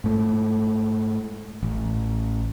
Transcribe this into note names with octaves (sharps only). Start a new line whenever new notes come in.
G#2 A3
A1